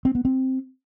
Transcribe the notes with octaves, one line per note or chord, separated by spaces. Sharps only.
C4
B3
C4